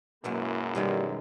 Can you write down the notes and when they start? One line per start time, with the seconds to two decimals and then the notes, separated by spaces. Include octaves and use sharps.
0.24 F#2 B2 F#3 G#3 A#3 E4
0.75 B2 D#3 G3 G#3